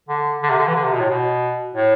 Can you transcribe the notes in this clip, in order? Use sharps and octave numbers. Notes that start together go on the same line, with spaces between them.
D3
D3
C3
D3
E3
D3
C3
B2
A2
B2
A2